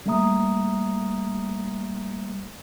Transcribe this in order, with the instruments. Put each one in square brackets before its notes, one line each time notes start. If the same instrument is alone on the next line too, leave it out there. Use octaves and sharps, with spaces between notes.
[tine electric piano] G3 A3 A#3 E5 A#5 D#6